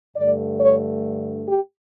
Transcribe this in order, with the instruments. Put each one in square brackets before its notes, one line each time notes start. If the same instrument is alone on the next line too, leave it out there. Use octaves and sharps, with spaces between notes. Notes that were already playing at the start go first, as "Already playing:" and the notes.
[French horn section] G2 D3 A3 D5
C#5
G4